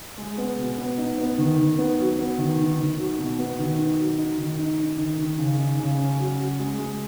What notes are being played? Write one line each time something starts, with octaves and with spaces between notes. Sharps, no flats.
G#3
B3
B2
B3
D#4
B3
D#3
D#3
B3
F#3
B3
D#3
D#3
D#3
F#3
B2
B3
D#3
D#4
F#3
D#4
D#3
D#4
D#4
D#3
D#3
C#3
D#4
C#3
C#4
F#3
F#3
G#3
G#3